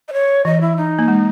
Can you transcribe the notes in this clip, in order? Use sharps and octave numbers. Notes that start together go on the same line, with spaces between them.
D#5
C#5
E3 D#5
E4
D#4
A#3
G#3